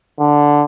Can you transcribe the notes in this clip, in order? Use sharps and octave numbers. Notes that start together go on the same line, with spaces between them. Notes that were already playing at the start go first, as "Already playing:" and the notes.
D3